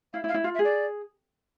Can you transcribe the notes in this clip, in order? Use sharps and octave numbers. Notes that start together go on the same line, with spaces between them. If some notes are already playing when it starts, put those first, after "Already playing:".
E4 F5
E4
F5
E4
F4 F5
E5
G#4
D5